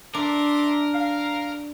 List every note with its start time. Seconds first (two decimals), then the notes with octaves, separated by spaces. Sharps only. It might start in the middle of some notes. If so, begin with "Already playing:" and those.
0.14 D4 A#4 E5 C6 D6
0.93 F5